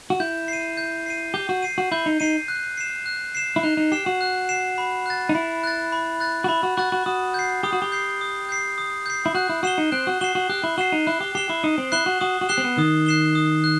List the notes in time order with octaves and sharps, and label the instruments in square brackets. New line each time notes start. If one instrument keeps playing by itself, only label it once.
[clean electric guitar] F#4
[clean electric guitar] E4 [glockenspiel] G6
[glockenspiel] C7 D#7
G6
C7 D#7
[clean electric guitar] G4 [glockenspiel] G6
[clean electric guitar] F#4
[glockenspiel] C7 D#7
[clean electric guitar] F#4
[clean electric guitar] E4 [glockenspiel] G6
[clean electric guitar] D#4
[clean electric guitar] D#4 [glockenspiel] C7 D#7
[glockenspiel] F#6
C7 E7
F#6
C7 E7
[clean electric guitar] E4
[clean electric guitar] D#4 [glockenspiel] F#6
[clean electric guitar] D#4
[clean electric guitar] G4 [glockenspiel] C7 E7
[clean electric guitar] F#4
[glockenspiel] F#6
C7 E7
B5
F#6 A6
[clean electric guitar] D#4
[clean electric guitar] E4 [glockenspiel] B5
[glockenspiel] F#6 A6
B5
F#6 A6
[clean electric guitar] F#4
[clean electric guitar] E4 [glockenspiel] B5
[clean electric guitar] F#4
[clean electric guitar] F#4 [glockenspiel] F#6 A6
[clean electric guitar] F#4
[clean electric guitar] F#4 [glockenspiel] D#6
[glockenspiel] G6 C7
[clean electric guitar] G4 [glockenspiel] D#6
[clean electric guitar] F#4
G4
[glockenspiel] G6 C7
D#6
G6 C7
D#6
G6 C7
[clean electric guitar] E4
[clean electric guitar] F#4 [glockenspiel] F#6
[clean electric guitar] E4
[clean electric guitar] F#4 [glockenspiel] C7 E7 G7
[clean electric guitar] D#4
[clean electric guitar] C4 [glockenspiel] F#6
[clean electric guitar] F#4
[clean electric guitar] F#4 [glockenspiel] C7 E7 G7
[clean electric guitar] F#4
[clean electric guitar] G4 [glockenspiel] F#6
[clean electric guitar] E4
[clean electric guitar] F#4 [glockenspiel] C7 E7 G7
[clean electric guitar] D#4
[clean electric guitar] E4 [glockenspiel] F#6
[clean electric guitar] G4
[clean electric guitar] G4 [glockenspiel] C7 E7 G7
[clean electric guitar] E4
[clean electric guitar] D#4 [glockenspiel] D#6
[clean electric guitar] C4
[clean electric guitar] E4 [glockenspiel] F#6 C7 E7 G7
[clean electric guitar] F#4
[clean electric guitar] F#4 [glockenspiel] D#6
[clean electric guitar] F#4
[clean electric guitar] G4 [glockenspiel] F#6 C7 E7 G7
[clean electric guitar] C4
B3
[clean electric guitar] D#3 [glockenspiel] D#6
[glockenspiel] F#6 C7 E7 G7
D#6
F#6